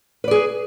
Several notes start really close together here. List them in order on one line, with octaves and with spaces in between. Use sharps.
B4 D5 G#4